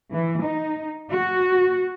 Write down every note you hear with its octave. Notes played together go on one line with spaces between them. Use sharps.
E3
D#4
F#4